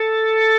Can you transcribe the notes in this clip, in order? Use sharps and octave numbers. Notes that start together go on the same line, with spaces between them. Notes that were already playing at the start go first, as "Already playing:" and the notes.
Already playing: A4